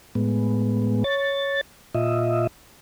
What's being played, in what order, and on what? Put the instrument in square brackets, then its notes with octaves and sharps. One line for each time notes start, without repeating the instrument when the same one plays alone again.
[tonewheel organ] A2 G#3 B3
C#5 A6
A#2 F4 D#5 E5